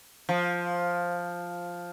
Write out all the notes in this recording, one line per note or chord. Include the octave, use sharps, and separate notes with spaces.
F3